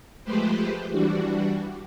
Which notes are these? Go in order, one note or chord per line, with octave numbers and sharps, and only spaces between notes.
F3 G#3 A3 G4 B4 C5
E3 G3 D4 F#4